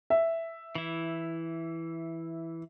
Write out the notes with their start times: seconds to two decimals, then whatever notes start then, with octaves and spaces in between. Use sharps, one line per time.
0.10 E5
0.75 E3 E4